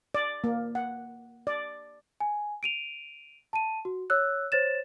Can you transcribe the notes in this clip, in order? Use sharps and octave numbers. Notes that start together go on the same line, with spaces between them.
D5
A#3
F#5
D5
G#5
D7 D#7 F7
A5 D#7
F#4
C#5 E6 F#6
C5 C#5 A6 E7